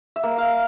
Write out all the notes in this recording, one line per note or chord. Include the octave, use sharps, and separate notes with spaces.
E5
A#3
F5